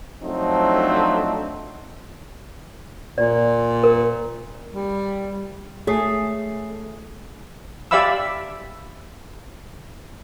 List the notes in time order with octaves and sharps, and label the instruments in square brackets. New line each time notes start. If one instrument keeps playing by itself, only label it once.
[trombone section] F3 F#3 A3 C4 D4 D#4
[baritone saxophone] A#2 [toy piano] D5
[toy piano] A#4
[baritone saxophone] G3
[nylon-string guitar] A3 [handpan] G#4 [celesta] C#5 D#6 C7
[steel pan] G4 D5 E5 F5 B5 E6